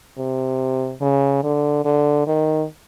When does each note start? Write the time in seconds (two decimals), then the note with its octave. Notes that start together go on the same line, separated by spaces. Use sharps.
0.18 C3
1.01 C#3
1.43 D3
1.85 D3
2.27 D#3